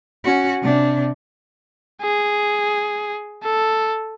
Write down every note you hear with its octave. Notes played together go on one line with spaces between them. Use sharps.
C#4 F#4
C3 D4
G#4
A4